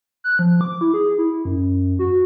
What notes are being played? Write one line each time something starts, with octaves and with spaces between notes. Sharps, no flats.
F#6
F3
D6
E4
G#4
E4
F#2
F#4